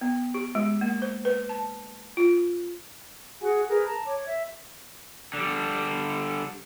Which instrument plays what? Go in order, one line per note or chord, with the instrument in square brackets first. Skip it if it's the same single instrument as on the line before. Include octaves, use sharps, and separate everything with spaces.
[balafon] B3
G4
G#3
A#3
C5
B4
A5
F4
[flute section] F#4 G#4 F#5 G#5
G#4 A#4 B4
A5 A#5
C#5 D6
E5
[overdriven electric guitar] D3 G3